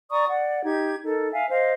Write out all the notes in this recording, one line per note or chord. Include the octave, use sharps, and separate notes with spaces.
D5 A#5 C#6 D#6
D5 F#5
D#4 G4 G#6
D#4 A4 A#4
E5 F5 G#5
C5 D#5 F5